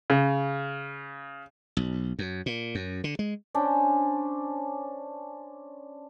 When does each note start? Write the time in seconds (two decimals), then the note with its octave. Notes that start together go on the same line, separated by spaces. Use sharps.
0.10 C#3
1.77 B1
2.19 F#2
2.46 A#2
2.75 F#2
3.04 D3
3.19 G#3
3.54 C#4 D4 C5